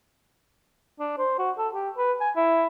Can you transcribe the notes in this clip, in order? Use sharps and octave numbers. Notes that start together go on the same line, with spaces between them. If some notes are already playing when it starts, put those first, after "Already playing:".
D4
C5
F#4
A4
G4
B4
G#5
E4